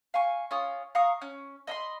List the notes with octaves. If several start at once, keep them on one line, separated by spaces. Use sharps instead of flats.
F5 G#5 C#6
C#4 F4 D#6
F5 A#5 C#6 D#6
C#4
D#5 E5 B5 C6